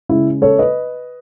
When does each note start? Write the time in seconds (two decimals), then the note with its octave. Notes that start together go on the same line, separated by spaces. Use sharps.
0.09 C#3 G#3 E4
0.42 A4 C#5
0.59 B4 D#5